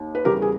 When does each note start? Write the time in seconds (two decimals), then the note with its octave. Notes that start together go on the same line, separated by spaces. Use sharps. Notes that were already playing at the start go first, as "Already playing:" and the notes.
Already playing: D#2
0.15 B4
0.25 E2 C#3 G3 G4 A#4
0.42 G#4